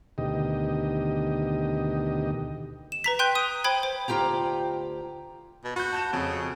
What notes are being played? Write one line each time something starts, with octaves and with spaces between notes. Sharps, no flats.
D2 B2 D#3 G4 D#5
E7
B4 A#5 B6
G5 C6 F#6 G6 D#7
D#6 D#7
C5 G5 B5 G#6
C5
D2 F4 G4 G5 A#5
B2
F#4 B5 G6
A5 G6 E7
F2 C#3